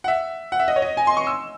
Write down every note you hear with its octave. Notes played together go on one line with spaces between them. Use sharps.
F#5
E5
F#5
E5
D#5
C#5
D#5
G#5
C6
C#6
E6